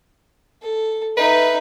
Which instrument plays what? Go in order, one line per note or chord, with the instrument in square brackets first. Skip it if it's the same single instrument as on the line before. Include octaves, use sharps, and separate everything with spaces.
[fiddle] A4
[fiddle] D#4 E5 [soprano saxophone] B4